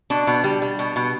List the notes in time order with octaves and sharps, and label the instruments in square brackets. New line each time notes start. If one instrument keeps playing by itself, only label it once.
[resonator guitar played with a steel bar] B2 D4
B2
G3
G3
B2
B2